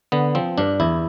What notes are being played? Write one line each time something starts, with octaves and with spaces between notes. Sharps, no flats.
D3 B3
F3 C4
G2 D4
E2 E4